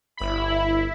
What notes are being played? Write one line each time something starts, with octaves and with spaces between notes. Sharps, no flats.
G1 E4 B5